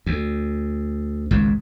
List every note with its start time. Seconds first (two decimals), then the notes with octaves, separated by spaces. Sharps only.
0.06 D2
1.31 G#1 C#2 G#2